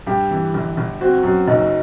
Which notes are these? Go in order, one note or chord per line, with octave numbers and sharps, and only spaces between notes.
G2 G4
E3
G1
G1
C4 F#4
F#2 F#4
F#1 D#4